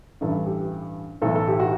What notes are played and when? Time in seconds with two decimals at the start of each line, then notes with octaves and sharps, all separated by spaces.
0.21 A1 G2 E3 A4
0.46 G4
1.22 B1 A2 E3 A4
1.35 A4
1.47 G4
1.60 F#4